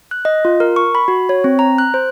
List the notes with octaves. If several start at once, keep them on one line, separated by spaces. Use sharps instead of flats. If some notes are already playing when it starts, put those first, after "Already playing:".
F#6
D#5
F4
A#4
C#6
B5
F#4
C#5
C4
A#5
F#6
C5